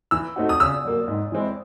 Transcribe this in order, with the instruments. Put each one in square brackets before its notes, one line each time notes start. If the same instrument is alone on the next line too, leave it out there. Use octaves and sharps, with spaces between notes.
[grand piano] E3 [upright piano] E6
[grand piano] A3 C4 D#4 F#4
[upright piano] D#6
[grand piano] C#3 [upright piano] E6
[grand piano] F#3 A#3
G#2
E3 G#3 C4 E4